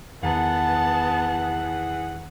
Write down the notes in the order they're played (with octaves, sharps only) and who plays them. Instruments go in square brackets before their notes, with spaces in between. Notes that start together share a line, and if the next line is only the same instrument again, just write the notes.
[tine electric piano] E2 D#3 A#5 [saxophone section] E3 G#4 F#5 [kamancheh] B3 A5